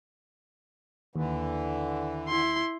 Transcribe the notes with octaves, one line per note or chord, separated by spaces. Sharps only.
D#2 D3 E3
E4 C6